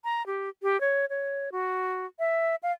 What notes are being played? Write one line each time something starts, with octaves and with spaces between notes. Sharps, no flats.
A#5
G4
G4
C#5
C#5
F#4
E5
F5